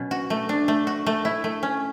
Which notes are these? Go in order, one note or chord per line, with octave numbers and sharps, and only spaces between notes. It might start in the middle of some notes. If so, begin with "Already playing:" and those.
Already playing: B2 F#3 C#4
F#4
A3
D4
A3
F#4
A3
E4
A3
C#4